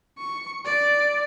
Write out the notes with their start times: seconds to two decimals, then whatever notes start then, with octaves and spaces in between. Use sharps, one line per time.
0.19 C#6
0.65 D5